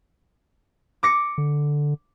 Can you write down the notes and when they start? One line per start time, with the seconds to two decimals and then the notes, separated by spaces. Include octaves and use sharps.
1.03 D6 A#6 C#7
1.38 D3